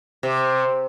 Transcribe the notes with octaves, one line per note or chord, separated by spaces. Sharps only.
C3